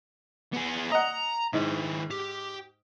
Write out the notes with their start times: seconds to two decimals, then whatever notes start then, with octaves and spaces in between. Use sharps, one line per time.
0.54 B3 G#4
0.92 D#5 F#5 A#5
1.53 G#2 D#3 E4
2.11 G4